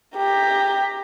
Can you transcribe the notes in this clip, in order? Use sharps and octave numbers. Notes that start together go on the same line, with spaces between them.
G4 A#5